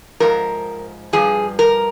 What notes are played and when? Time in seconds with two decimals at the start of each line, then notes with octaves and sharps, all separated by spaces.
0.20 G#2 F3 A#4
1.13 G2 F3 G#4
1.59 A#4